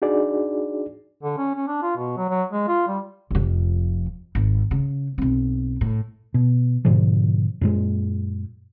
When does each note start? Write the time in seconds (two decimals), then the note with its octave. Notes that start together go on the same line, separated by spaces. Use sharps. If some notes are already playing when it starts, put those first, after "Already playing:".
0.02 D4 D#4 F#4 G#4 D5
1.23 D3
1.37 C#4
1.55 C#4
1.67 D4
1.82 F4
1.96 B2
2.17 F#3
2.29 F#3
2.52 G#3
2.67 F4
2.87 G3
3.31 F1 F2
4.35 G#1
4.71 C#3
5.18 B1 C4
5.81 A2
6.34 B2
6.85 G#2 B2 D3 F3
7.61 F#2 A#2 G#3